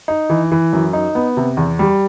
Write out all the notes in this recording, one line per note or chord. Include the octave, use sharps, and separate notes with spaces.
D#4
E3
E3
F#2
D#4
B3
C3
E2
G3